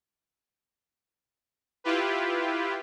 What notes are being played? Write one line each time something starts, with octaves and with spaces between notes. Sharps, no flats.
E4 F4 G4 B4